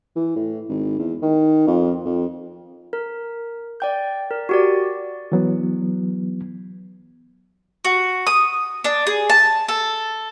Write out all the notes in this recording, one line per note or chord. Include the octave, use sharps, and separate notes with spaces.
E3
A2
G#1
E2
D#3
F2
F2
A#4
D5 G5 G6
A#4
F#4 G4 D5
E3 F#3 B3
F#4
D#6
D4
G#4
A5
A4